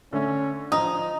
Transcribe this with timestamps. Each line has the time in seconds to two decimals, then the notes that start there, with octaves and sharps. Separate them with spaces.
0.13 D3 A3 C#4
0.72 F3 D#4 D#6